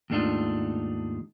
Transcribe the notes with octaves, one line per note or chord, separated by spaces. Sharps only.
D#2 G#2 A3 D4 D#4 F4